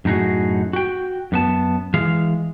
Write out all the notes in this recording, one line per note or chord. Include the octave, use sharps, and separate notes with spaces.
F#2 A2 D#4 F#4 G#4
F#4 G5
F#2 B3 A5
E3 G#3 F5